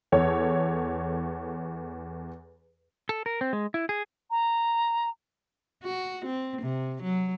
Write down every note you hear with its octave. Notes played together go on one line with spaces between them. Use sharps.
E2 A4 C#5
A4
A#4
C4
G#3
E4
G#4
A#5
F#4
C4
C3
F#3